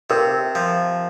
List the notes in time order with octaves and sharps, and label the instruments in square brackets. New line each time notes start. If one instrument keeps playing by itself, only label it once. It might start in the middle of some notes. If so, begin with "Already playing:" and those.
[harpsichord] C3 [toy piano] A#4
[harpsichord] F3